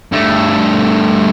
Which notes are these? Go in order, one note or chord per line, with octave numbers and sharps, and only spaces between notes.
G2 A3